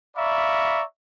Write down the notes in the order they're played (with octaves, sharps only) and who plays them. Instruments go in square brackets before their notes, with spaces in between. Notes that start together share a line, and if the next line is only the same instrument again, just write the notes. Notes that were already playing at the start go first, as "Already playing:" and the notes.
[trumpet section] D5 E5 F5 A#5 B5 C#6